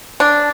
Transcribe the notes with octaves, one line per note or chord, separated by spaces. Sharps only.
D4